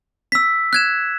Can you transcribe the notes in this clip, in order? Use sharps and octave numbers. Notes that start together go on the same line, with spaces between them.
E6 B6
F#6 G#6 E7